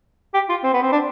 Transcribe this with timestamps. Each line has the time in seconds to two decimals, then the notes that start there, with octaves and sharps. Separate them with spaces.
0.34 G4
0.49 F4
0.63 C4
0.73 B3
0.82 C4
0.92 D4